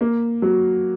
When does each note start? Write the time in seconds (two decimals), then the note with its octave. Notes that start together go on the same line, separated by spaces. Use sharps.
0.01 A#3
0.42 F#3